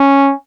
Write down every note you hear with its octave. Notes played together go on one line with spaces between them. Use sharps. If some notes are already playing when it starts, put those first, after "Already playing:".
Already playing: C#4